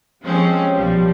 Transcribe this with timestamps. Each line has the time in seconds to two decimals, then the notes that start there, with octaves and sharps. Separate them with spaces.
0.23 F3 G3 G#3 C4 C#4
0.74 B1 F3 G3